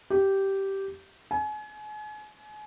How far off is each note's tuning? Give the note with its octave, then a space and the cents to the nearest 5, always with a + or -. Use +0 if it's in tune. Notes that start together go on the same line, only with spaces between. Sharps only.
G4 -10
G#5 +35